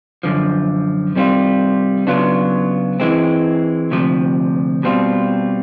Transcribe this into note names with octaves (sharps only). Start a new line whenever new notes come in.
F#2 D3 F3
C3 D#3 G3 C4 F4
C#3 F#3 B3 D4 F4
E3 G#3 C4
D2 C3 F3
B2 G3 C4 F4